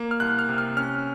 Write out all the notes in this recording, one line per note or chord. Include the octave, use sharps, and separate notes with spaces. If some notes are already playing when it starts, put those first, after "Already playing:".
Already playing: A#3
F6
C2 F#6
F6
C3
F6
C#4 F6